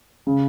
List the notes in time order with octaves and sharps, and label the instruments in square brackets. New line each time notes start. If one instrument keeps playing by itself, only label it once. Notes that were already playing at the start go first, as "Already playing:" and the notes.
[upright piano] C#3